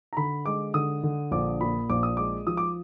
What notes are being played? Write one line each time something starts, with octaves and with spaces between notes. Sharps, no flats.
A#5
D3 B5
G#3 D6
D3 D#6
D3
A#1 D6
A#2 B5
A#1 D6
D#6
G#3 D6
F3 D#6
D6